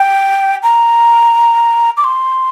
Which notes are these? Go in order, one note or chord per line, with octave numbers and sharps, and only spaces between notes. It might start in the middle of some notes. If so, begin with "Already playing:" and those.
Already playing: G5
A#5
D6
C6